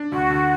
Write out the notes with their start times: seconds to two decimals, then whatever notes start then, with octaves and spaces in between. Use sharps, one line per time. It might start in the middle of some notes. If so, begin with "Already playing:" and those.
Already playing: D4
0.12 D2 F#4
0.30 D3